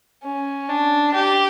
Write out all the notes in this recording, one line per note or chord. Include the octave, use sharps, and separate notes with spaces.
C#4
D4
G4